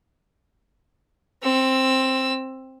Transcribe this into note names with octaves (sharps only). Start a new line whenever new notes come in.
C4 E6